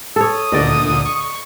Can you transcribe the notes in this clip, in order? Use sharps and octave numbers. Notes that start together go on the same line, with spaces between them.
A4 C#5 D#6
D2 A#2 D3 D5 D#5
C#6